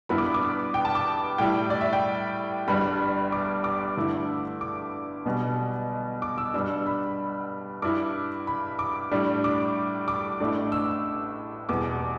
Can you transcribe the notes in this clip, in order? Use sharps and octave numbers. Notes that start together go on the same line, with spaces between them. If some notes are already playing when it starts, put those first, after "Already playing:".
G2 G3 B3 E4 B5
D6
B5
D6
B5
G5
A5
D6
A2 G3 E4 G5
D5
E5
G5
G1 G2 G3 B5
D6
D6
G2 D3 A3 E4
D6
B1 B2 G3
D6
E6
G2 G3 D4 E6
B5
G2 G3 E4 D6
B5
D6
A2 G3 D4
D6
D6
A1 A2 A3 D4
E6
E2 B2 G3 D6